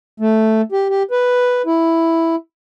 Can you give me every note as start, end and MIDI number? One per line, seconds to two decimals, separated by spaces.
0.20 0.62 57
0.72 0.88 67
0.90 1.03 67
1.11 1.62 71
1.66 2.36 64